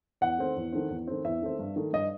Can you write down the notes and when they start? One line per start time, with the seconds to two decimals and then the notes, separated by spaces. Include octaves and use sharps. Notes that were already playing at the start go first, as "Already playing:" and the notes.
0.21 E2 F#5
0.38 D#3 A3 C4
0.56 E2
0.72 D#3 A3 C4
0.90 E2
1.07 D#3 A3 C4
1.24 E2 E5
1.42 D#3 A3 C4
1.59 G2
1.76 D#3 A3
1.93 G2 D#5